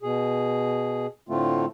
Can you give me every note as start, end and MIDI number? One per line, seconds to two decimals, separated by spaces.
0.03 1.07 47
0.03 1.07 68
1.29 1.66 45
1.29 1.66 50
1.29 1.66 57
1.29 1.66 60
1.29 1.66 65